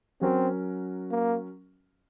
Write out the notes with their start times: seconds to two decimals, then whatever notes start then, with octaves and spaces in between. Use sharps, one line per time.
0.21 F#3 C4 C#4 F#4 A#4
1.11 A#3